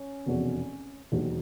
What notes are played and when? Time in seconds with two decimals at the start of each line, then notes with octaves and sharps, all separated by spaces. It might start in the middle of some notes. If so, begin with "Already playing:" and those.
Already playing: C#4
0.26 F1 E2 B2
1.12 E1 D#2 D#3 F#3